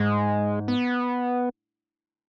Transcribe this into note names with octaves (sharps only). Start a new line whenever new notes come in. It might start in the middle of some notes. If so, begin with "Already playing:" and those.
Already playing: G#2 G#3
B3